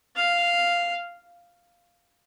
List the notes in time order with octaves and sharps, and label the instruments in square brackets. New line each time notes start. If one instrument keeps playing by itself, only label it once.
[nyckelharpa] F5